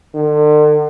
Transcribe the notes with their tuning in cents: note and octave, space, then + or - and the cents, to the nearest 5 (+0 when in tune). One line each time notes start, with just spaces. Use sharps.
D3 +40